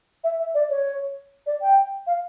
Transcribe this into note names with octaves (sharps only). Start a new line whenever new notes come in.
E5
E5
D5
C#5
D5
G5
F5